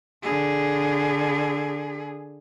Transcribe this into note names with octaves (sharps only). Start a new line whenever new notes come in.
D3 G#4